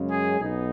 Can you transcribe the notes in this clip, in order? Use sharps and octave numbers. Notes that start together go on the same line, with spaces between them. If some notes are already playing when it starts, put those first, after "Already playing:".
Already playing: F#2 C#3 G#3 C#4
G#4
B1 B2 B3 D#4